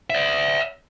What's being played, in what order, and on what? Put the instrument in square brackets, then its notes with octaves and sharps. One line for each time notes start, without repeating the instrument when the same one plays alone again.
[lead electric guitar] D5 E5